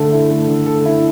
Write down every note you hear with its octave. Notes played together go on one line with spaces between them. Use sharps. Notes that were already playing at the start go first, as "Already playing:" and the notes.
Already playing: D3 A3 A4
E4
A3
D3
A4
E4